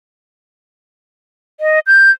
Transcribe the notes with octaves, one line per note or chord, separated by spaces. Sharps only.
D#5
G6